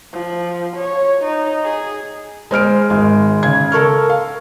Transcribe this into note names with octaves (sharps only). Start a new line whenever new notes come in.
F3
C#5
D#4
G#4
G#3 C5 F6 D7
G#1 G#3
C#3 G#6
A4 A#4 C#6 F6
F5